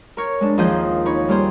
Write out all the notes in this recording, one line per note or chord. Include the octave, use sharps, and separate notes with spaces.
A#4 C#5
G#3 D4
D#2 F3 G#4 D#5 G6
D#4 C#5 B5
G3 A#3 G4 G#4 C5